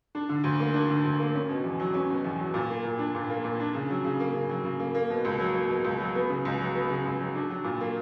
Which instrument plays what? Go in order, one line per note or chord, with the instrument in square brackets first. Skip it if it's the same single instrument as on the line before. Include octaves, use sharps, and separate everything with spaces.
[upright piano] D4
D3
D2
A#3
D4
D3
D2
A#3
C#4
B2
E2
F#3
C#4
B2
E2
F#3
A#2
A#3
A#2
D4
A#2
A#3
A#2
D4
C#3
F#3
C#3
A#3
C#3
F#3
C#3
A#3
A#3
B2
C#2
F#3
A#3
B2
C#2
F#3
B3
C#3
C#2
F#3
B3
C#3
C#2
F#3
D4
F#3
A#2
A#3